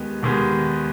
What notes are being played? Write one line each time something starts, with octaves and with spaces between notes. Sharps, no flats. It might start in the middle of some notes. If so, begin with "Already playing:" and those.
Already playing: D#2 D#3 G#3 B3
D#2 D#3 G#3 B3